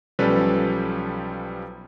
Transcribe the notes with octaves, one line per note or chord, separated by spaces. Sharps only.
B1 F3 G3 C#4 A4 B4